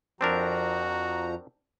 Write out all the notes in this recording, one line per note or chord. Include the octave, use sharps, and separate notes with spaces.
F2 F3 C4 D4 F#4 A#4 A#5